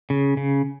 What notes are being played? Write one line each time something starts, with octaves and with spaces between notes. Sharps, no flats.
C#3
C#3